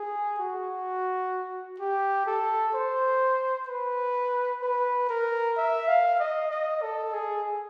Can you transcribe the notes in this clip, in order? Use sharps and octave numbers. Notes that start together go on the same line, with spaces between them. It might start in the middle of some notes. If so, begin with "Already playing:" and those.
Already playing: G#4
F#4
G4
A4
C5
B4
B4
A#4
E5
F5
D#5
D#5
A4
G#4